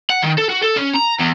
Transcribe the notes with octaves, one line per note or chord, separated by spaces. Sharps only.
F#5
D#3
A4
F#4
A4
C#4
A#5
E2